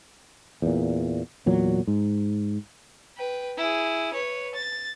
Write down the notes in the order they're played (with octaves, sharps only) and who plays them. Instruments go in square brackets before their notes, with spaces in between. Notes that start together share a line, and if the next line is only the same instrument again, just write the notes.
[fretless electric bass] E2 A#2
E2 A#2 F#3
G#2
[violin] B4 G5
E4 G#4
B4 C#5
A6